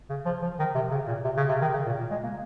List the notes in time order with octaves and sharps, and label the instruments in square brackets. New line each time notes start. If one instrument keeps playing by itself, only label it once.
[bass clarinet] C#3
F3
F3
D#3
C3
C#3
A#2
C3
C#3
C3
D#3
C#3
A#2
A#2
G#3
A#3